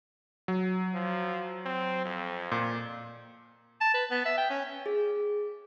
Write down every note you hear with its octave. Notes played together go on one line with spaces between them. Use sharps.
F#3
F3
C4
F2
A#2
A5
B4
B3
E5
G5
C#4
G#4